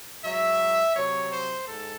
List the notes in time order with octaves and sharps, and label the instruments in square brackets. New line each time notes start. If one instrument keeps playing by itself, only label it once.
[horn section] G#2 F#3 E5
C3 F#3 C#5
C5
G#2 A4